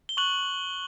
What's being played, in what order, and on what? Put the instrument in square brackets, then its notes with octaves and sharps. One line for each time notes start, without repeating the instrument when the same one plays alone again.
[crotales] G7
C#6 F#6 F#7